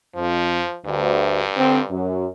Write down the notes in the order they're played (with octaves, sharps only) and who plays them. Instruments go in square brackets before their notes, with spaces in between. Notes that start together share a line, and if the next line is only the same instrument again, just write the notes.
[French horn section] F2 [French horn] F3
[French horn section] D2 [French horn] G2
[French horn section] D3 C4
F#2